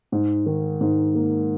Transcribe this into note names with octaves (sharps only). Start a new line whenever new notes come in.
G#2
D#3
G#2
A#3